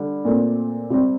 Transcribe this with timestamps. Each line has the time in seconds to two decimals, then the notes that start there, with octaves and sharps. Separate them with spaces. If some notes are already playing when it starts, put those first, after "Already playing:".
Already playing: D3 G3
0.25 A#2 A3 C4
0.90 C3 G3 C4